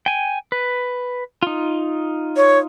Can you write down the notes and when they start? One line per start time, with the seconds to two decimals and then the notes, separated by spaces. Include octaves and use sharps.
0.06 G5 G#5
0.52 B4
1.43 D#4 F4
2.37 C#5